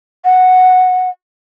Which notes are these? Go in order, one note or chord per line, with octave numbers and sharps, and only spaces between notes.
F#5